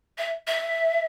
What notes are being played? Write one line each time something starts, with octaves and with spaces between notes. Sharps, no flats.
E5
E5